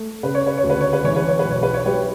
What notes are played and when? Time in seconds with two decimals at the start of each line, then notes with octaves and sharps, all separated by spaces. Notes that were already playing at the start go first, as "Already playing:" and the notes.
Already playing: A3
0.23 C#3 B4
0.35 C#5
0.47 B4
0.58 C#5
0.64 D2
0.70 B4
0.81 C#5
0.93 B4
1.04 E3 C#5
1.16 B4
1.28 C#5
1.39 B4
1.45 B1
1.51 C#5
1.63 B4
1.74 C#5
1.85 F#3 G4 B4